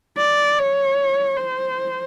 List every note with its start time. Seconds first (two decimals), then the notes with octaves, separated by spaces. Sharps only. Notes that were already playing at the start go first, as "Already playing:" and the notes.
0.18 D5
0.58 C#5
1.37 C5